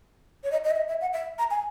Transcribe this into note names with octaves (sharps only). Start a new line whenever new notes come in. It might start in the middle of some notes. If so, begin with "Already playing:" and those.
C#5
D#5
D#5
E5
D#5
E5
F#5
E5
A#5
G#5